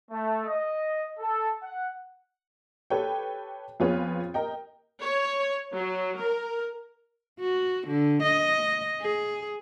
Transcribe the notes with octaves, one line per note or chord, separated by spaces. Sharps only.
A3
D#5
A4
F#5
G4 A4 B4 C#5 G5
F2 B3 F4 G#4 B4 C#5
A#4 D#5 G5
C#5
F#3
A#4
F#4
D3
D#5
G#4